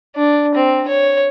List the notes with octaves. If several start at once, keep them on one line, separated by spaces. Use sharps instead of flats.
D4
C4
C#5